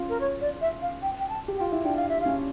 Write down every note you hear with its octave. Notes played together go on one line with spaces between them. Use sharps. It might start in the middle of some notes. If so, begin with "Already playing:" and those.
Already playing: C#4 F4
A#4
C#5
D5
E5
F5
G5
G5
A5
G4
F4 G5
E4
D4 G5
F5
E5
C#4 F5